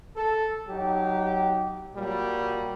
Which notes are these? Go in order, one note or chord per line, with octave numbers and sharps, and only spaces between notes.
A4
F#3 D#4 G4
A#2 F#3 G3